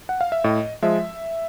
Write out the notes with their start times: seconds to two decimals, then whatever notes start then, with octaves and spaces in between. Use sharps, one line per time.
0.09 F#5
0.21 F5
0.32 E5
0.44 A2 D#5
0.82 F3 G#3 E5